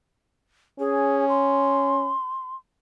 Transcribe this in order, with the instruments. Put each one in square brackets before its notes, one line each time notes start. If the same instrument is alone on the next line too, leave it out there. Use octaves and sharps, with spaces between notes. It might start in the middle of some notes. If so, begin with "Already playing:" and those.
[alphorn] C#4 [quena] G#4
[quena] C6